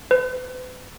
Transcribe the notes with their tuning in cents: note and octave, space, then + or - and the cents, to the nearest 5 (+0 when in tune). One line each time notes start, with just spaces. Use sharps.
B4 +40